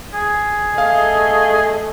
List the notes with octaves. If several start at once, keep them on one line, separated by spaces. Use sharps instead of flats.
G#4
A3 D#5 F5